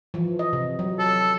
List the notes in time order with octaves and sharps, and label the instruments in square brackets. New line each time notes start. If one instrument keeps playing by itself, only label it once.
[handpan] E3 F3
D#5
C3
F#3
[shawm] A4